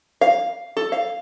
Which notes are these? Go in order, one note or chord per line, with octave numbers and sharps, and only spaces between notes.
F5
A4
F5